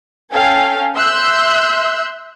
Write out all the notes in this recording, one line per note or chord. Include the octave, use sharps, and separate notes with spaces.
C#4 A4 F5 G5 G#5
E5 C6 E6 F#6 G6